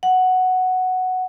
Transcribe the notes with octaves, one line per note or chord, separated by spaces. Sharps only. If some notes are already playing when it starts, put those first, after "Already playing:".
F#5